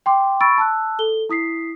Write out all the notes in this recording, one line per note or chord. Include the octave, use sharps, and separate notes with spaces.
G5 C6 D6
B5 C#6 E6 A6 D7
A5 E6 F#6
A4 G7
E4 D#6 B6 C7